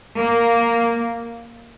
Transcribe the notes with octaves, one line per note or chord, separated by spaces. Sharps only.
A#3